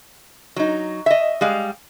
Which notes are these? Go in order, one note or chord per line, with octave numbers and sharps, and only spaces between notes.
F#3 D#4
D#5 E5
G3 G#3 F5